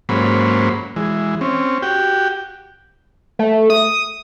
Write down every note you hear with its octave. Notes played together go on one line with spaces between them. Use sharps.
G#2 F#3 A#3 C#4 C5 B5
E3 G#3
C4 C#4
F#4 G4 G5
A3
D#6